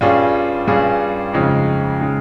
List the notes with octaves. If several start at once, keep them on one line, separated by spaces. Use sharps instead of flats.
G2 G3 C#4 F4 G#4
G2 G3 C#4 F4 G#4
F2 C#3 G#3 D#4
C#3 G#3 D#4